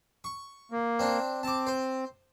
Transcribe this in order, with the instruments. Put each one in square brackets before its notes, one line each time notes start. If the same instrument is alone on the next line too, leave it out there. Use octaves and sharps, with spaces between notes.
[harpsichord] C#6
[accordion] A#3
[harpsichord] C4 D4
[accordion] C4 [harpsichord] A5 D6
[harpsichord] C5